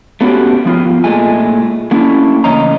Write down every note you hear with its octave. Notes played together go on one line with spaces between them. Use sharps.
A3 B3 C#4 F#4 G4
F3 B3 F4
A#2 G#3 A3 G#5
A3 A#3 C#4 D4 E4
A2 C#3 E3 C#5 D#5 A#5